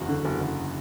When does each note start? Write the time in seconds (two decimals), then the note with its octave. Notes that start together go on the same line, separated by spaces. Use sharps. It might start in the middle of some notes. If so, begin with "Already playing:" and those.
Already playing: F#1 E2 F#4
0.09 D3
0.25 F#1
0.41 F#1